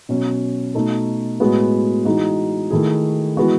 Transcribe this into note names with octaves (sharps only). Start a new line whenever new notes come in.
B2 F#3 C#4
B2 A3 D#4 A4
A2 G#3 B3 F#4
E3 G#3 D#4 F#4
D#3 A3 E4 G#4
E3 G#3 B3 F#4